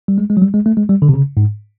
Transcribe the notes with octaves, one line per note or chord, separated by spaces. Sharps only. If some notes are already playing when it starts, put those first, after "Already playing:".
G3
G#3
G#3
F#3
G3
G#3
A3
G#3
G3
D3
C3
C#3
G#2